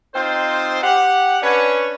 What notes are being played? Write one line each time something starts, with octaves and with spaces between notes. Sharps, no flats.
C4 D#4 F4 C5
G4 F#5
C#4 D4 B4 C#5